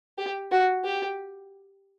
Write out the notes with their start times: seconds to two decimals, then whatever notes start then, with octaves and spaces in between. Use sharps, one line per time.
0.18 G4
0.52 F#4
0.84 G4